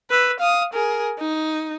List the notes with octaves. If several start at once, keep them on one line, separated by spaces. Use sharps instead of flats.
B4 E6
F5 D#6
G#4 A#4
D#4